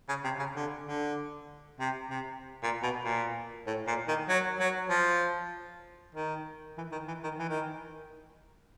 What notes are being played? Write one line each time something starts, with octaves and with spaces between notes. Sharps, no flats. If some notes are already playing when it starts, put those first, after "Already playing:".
C#3
C3
C#3
D3
D3
C3
C3
A#2
B2
A#2
A2
A#2
D#3
F#3
F#3
F3
D#3
E3
D#3
E3
D#3
E3
D#3